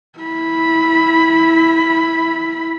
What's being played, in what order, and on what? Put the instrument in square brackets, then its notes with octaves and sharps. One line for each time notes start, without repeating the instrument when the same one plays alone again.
[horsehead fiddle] E4 B5